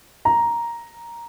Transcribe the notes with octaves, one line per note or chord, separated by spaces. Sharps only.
A#5